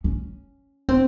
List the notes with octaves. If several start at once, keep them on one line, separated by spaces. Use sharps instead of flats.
C#4
C4